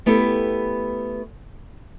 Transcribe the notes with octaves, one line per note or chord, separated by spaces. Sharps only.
A3 B3 E4 G4 A4